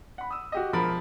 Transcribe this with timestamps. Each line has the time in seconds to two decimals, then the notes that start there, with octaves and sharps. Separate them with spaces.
0.18 F#5 B5
0.31 D#6 E6
0.52 F#4 G4 D#5
0.73 E1 F3 A#4 B5